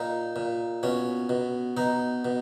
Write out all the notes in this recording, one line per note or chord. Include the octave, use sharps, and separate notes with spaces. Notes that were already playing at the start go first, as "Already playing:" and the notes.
Already playing: A#2 D#4
A#2
B2 C#4
B2
B2 D#4
B2